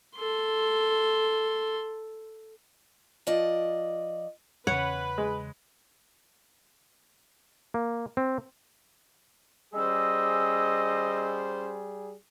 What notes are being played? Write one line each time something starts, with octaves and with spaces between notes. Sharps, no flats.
A4 C6
F3 D5 D#5
E2 C#3 B4 C#5 F#5
G#3
A#3
C4
G3 C#4 G#4 C5 D#5 E6